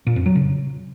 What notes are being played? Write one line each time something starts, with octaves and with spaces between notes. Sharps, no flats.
A#2
F2
F#3
C#3